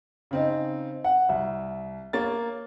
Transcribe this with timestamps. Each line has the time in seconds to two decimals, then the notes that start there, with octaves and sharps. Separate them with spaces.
0.31 C#3 C4 D#4
1.04 F#5
1.29 C2
2.13 A#3 C#5 A6